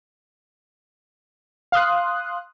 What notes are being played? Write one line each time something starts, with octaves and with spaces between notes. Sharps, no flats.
F5 C6 D#6 F#6